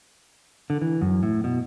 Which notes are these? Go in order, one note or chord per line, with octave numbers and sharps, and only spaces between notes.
D3
E3
F#2
A2
B2